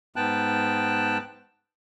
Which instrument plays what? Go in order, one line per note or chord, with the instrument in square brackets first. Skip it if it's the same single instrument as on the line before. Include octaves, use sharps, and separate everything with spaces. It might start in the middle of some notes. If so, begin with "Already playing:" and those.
[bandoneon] G#2 B3 G5 A5 F#6